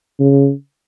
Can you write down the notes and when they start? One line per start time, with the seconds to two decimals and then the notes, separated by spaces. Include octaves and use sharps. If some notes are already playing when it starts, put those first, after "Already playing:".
0.20 C#3